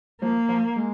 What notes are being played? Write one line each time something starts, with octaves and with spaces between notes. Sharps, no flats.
F3 A#3
F3
G#3